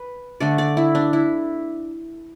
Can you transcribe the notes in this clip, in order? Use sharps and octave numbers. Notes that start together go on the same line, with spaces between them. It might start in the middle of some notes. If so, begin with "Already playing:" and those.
Already playing: B4
D3 A3 D4 D5
D5
E4
D4
E4